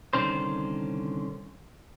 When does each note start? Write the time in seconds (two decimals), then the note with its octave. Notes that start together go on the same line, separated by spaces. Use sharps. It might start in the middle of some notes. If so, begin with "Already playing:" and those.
0.13 C2 A2 D3 D#3 C#4 C5